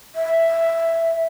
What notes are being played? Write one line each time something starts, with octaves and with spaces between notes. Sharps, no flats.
E5